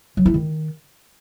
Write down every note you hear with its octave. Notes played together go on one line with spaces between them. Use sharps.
F#3
E4
D#3